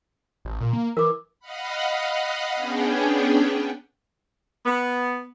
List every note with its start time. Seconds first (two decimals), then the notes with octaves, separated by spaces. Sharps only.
0.45 A1
0.61 A#2
0.73 A#3
0.97 E3 A#4 D6
1.40 D#5 F5 F#5 B5
2.55 B3 C#4 D4 G#4 G5
4.65 B3